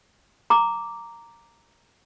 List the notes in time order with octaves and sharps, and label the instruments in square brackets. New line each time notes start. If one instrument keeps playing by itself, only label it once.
[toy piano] A#5 D6